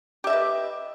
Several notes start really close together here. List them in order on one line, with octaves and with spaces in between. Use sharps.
G4 E5 D#5 B4